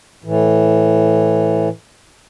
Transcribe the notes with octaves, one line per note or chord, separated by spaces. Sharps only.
A2 E3